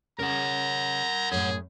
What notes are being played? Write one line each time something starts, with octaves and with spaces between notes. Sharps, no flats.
C#3 C#4 A#4 F#5 A#5
F#2 A2 G#4